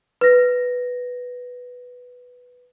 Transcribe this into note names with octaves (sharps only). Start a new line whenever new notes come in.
B4 A#6